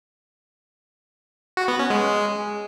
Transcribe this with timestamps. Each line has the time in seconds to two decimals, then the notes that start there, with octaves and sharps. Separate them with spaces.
1.57 F#4
1.68 B3
1.79 C#4
1.90 G#3